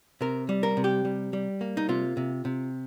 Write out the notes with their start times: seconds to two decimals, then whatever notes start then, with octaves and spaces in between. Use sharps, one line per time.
0.21 C3 A#4
0.49 G3
0.63 A#4
0.77 C3
0.84 G4
1.05 G3
1.33 G3
1.61 A#3
1.77 D#4
1.89 C3 F4
2.17 C3
2.45 C3